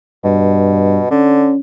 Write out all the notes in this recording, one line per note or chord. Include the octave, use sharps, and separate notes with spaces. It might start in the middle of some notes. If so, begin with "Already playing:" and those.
G2 B2
D3 C#4